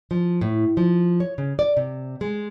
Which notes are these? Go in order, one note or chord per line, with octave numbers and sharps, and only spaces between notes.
F3
A2
F3
C#5
C#3
D5
C3
G#3